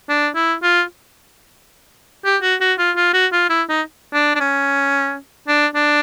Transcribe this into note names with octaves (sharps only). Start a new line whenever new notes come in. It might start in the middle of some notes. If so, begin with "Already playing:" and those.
D4
E4
F4
G4
F#4
F#4
F4
F4
F#4
F4
E4
D#4
D4
D4
C#4
D4
D4